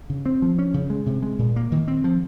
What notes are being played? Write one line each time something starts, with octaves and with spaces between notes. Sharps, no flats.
C#3
C4
F3
C#4
C#3
G#3
C3
G#3
A#2
A#3
D#3
C4
F3